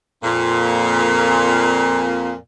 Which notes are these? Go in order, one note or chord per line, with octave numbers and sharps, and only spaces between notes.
F2 A#2